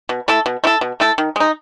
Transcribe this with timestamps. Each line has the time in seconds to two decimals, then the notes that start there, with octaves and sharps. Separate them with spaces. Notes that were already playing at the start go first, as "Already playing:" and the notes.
0.09 B2
0.28 A3 E4 A4
0.46 B2
0.64 A3 E4 A4
0.81 B2
1.00 A3 E4 A4
1.18 D#3
1.36 G#3 D#4